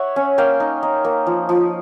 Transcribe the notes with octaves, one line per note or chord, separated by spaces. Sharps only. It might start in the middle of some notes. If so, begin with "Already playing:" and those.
Already playing: C#5 E5 F#5
C#4
A#3 F5 G5
D#4
D#4
A#3
F3
F3